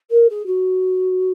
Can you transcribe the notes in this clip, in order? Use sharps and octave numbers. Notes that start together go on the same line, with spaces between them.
A#4
G#4
F#4